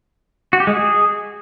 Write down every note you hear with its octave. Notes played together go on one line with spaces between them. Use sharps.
F#4
G4
G#3
G#4